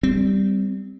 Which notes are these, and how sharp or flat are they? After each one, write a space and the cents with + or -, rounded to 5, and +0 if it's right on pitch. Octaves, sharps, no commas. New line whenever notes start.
G3 +0 C4 -20